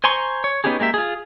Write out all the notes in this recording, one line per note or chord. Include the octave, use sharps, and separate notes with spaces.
C5 G#5 A#5 C6 C#6
C#5
B3 C#4 D#4 G4 G#4
G#3 A#3 G4 E5
F4 G#4